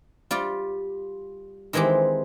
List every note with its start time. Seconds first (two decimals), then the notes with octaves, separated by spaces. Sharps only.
0.31 G3 F4 G4 D5
1.73 D#3 E3 G#3 C4 G4